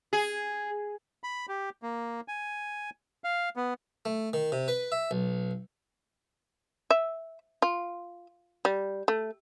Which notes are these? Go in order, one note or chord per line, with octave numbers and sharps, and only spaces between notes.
G#4
B5
G4
A#3
G#5
F5
B3
A3
D#3
C3
B4
E5
B1
E5
F4
G3
A3